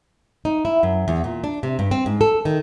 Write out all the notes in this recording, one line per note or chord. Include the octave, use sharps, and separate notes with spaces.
D#4
E4
F#2
E2
A#2
D4
C3
G2
C4
G#2
A4
D#3